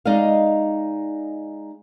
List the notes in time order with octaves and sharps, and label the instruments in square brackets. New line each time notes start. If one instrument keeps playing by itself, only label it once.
[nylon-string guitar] G#3 D#4 D5 D#5 F5